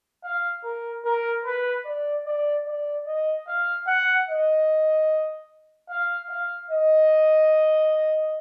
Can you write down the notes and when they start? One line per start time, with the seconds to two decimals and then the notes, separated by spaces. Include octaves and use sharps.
0.24 F5
0.64 A#4
1.05 A#4
1.45 B4
1.85 D5
2.26 D5
2.66 D5
3.07 D#5
3.48 F5
3.88 F#5
4.28 D#5
5.89 F5
6.30 F5
6.70 D#5